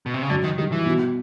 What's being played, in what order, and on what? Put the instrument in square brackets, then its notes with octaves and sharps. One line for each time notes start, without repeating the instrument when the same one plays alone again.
[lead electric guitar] B2
C3
C#3
[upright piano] F#2 [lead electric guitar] D3
[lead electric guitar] D#3
[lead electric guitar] D#3 [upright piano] G3
[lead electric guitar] E3
[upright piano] B2